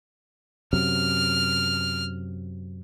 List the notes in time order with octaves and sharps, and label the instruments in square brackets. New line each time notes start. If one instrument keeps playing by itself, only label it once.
[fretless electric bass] F#2 C3 F#3 [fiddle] F6